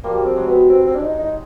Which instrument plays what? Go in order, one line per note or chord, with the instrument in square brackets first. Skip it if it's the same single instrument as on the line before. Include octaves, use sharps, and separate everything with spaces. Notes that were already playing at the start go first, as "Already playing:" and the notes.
[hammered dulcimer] F3 G3 [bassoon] A#3
[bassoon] C4
[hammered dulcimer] F#3 G#3
[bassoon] B3
C4
C4
D4
D#4
D#4